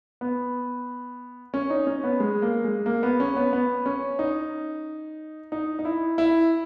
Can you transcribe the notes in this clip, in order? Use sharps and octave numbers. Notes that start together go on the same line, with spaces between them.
B3
C#4
D#4
C#4
B3
G#3
A#3
G#3
A#3
B3
C#4
B3
B3
C#4
D#4
D#4
D#4
E4
E4